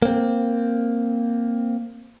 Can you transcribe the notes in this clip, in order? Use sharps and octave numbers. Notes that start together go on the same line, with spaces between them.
A#3 C4